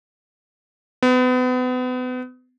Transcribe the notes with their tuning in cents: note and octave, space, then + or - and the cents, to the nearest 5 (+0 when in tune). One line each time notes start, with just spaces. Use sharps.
B3 +35